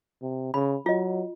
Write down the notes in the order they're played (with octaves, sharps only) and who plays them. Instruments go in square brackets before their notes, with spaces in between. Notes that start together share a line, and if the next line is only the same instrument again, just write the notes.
[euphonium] C3
[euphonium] C#3 [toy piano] B5
[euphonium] F#3 [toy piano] F4 D#5